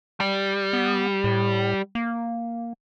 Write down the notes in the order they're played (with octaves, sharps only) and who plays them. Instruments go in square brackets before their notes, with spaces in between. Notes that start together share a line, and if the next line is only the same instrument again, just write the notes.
[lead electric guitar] G3
[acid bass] B3
A2
A#3